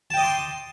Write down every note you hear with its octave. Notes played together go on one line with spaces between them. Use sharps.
D#5 G5 A5 C6 D6